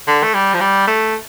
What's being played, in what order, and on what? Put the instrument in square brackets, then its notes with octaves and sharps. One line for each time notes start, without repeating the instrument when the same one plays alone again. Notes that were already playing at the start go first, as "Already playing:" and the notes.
[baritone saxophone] D3
A3
G3
F3
G3
A3